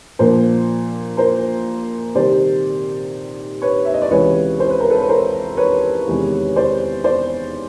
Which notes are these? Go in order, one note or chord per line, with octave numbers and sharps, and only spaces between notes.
A#2 F3 A#3 D4 A#4 C5
A#4 C5
C3 D#3 G3 C5 D5
B4 C#5
E5
D#5
D5
C#2 C3 E3 B4 C#5
C5
B4
A#4
A4 B4
B4
A#4 C5
B4 C#5
E2 C3 D#3 G#3
C5 D5
C5 D5